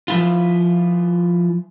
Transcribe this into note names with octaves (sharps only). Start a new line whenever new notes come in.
F3 E4 F4